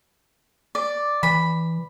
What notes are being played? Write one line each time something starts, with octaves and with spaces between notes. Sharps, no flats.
D5
E3 B5